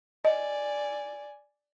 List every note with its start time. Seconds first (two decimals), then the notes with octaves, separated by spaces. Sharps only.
0.25 D5 D#5 G#5